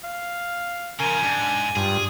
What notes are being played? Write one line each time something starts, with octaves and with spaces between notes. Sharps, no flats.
F5
C#3 F3 A#4 G#5
G#2 D4
G2 F4 G#4